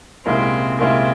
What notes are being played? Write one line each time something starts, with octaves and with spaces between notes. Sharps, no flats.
C2 A#2 G#3 C4 C#4 E4
C2 A#2 G#3 C4 C#4 E4